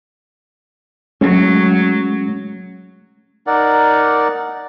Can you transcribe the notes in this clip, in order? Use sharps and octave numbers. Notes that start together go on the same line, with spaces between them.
F#3 G#3 A3 C#4
D#4 A#4 D5 F#5